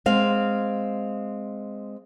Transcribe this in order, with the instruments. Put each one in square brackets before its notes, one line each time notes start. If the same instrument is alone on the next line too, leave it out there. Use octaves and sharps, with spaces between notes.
[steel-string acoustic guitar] G#3 C4 F5